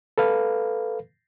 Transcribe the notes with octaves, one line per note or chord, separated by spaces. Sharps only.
A4 B4 F5